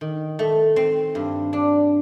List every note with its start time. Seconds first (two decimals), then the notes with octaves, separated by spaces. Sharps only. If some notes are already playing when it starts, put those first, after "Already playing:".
0.01 D#3
0.39 A3
0.76 C4
1.15 G2
1.53 D4